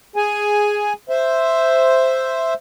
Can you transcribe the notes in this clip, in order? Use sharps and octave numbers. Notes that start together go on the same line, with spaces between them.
G#4 G#5
C5 E5